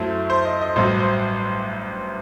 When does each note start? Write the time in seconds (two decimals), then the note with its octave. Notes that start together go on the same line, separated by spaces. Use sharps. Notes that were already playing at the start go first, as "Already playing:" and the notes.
Already playing: F#2 F#3 A3 E4 C5
0.30 C5
0.45 D#5
0.61 D#5
0.76 A1 G2 F#3 C5
0.99 C5